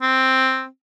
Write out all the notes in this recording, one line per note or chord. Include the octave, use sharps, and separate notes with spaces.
C4